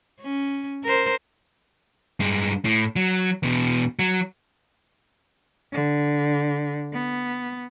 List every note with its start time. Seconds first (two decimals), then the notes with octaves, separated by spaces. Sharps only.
0.21 C#4
0.84 A#4 C5
2.20 G2 G#3
2.65 A2
2.96 F#3
3.43 E2 B2
3.99 F#3
5.73 D3
6.93 B3